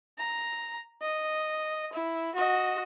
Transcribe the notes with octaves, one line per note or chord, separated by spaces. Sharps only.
A#5
D#5
E4
F#4 D#5